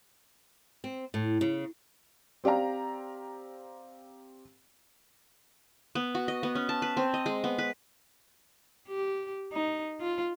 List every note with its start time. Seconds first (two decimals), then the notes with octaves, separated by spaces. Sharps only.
0.84 C4
1.14 A2
1.41 C#3
2.44 C4 G4 D5 F5 A#5
5.95 B3
6.15 F#4
6.28 D#5
6.43 B3
6.55 C#4
6.69 A5
6.82 B4
6.97 C4
7.14 D#5
7.26 G#3
7.44 B3
7.58 B4
8.88 G4
9.52 D#4
10.01 F4